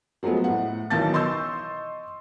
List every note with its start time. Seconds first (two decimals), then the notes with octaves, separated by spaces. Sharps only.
0.23 F3 F#3 G#3 A3 B3
0.44 A2 F#5
0.90 B1 D#3 E3 A5 G6 A6
1.13 D#5 C6 C#6 E6 G6